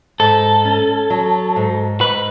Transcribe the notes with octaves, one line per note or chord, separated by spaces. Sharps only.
G#2 A4
C#4
F#3
G#2
G#2 B4